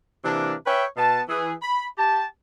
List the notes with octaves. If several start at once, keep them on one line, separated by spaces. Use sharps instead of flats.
C3 E3 A#3 D4
B4 C#5 E5 G5
B2 B3 A5
E3 G#4
B5
G4 A5